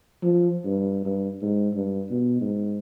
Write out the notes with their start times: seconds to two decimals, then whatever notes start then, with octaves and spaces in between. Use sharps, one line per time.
0.23 F3
0.65 G2
1.05 G2
1.42 G#2
1.75 G2
2.11 B2
2.41 G#2